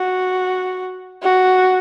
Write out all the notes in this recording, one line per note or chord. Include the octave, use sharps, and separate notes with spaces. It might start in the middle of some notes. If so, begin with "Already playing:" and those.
Already playing: F#4
F#4